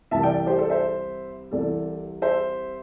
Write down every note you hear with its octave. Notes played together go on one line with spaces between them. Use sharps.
C2 C3 E3 E5 A5
D5 G5
G4 C5
A4 D5
C5 E5
C2 C3 E3 A4 D5
C5 E5